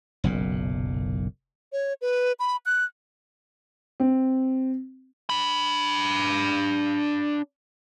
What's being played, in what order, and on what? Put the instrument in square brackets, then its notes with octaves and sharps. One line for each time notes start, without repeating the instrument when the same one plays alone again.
[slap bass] F#1 B1 A#2
[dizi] C#5
B4
B5
F#6
[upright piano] C4
[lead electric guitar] D4 B5